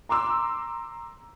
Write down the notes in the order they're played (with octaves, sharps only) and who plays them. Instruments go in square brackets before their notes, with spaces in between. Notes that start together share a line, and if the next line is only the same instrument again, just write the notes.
[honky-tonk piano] A#5 C6 D6 E6